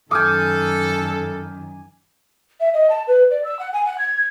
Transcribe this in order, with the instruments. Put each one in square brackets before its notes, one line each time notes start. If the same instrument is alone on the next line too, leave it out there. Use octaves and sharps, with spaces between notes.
[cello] F#2 D#3 [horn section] A4 [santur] G#5 D6 [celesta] D#6 F6 G6
[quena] E5
D#5
A5
B4
D5
E6
F#5
G#5
F#5
G#6